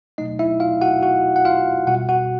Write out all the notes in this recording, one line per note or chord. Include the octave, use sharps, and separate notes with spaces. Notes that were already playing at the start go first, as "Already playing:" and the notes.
B2 F#3 A3 D#4 D#5
E4 E5
F4 F5
F#4 F#5
F#4 F#5
F#5
F4 F5
B2 G3 F#4 F#5
F#4 F#5